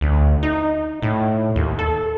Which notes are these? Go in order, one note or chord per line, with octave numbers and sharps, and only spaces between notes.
D2
D#4
A2
D#2
A4